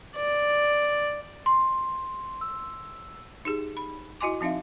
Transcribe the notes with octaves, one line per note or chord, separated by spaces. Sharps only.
D5
C6
E6
D#4 G4 G#4
B5
E4 F#4 D#5 G#5 C6 D6
F3 C4 D#4 E5 F5